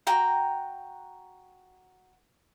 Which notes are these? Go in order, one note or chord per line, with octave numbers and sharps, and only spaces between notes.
F#4 G5 A#5